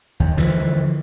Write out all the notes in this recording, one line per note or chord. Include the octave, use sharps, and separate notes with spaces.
D#2
D3 E3 F3